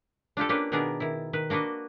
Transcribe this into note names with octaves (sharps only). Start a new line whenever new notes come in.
D4 F4 G4 A4
A#3 C#4 D4 G4 B4
B2 D#3 B3 D4 G#4 A#4
D#3 E4
D#3 B4
A#3 D4 F#4 B4 D#5